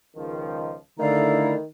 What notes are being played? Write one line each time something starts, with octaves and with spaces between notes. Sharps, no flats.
C#2 D#3 F3
D3 D#3 A3 E4 D5 F5 A#5